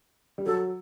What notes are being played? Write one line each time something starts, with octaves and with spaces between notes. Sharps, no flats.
G3
F#3 A4